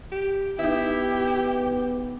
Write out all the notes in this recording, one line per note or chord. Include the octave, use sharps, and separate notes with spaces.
G4
G#2 B3 D#4 E4 G4 E5